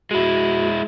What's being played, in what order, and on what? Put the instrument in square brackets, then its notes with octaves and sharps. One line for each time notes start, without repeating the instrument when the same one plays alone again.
[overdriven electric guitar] G#3 E4 [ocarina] F#4